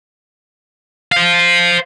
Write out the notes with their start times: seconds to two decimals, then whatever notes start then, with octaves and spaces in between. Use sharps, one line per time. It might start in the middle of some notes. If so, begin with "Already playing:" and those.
1.12 C5 F5